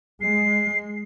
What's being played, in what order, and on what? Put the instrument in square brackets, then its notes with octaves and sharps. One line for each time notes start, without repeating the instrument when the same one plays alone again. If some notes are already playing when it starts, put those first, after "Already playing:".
[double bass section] G#3 [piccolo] C7